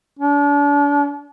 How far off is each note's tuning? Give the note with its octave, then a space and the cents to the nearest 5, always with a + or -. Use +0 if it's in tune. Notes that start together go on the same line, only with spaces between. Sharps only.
D4 -35